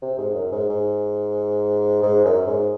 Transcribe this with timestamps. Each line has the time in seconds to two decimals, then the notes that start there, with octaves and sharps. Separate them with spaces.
0.02 C3
0.18 G#2
0.35 F#2
0.52 G#2
0.69 G#2
2.03 G#2
2.25 F#2
2.47 G#2